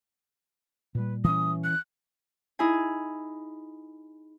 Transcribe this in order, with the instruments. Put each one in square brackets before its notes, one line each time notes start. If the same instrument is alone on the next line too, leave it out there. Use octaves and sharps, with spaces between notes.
[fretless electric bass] A#2 G3 [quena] B4
[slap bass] E3 C#4 [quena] D#6
[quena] F#6
[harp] D#4 E4 G#4 G#5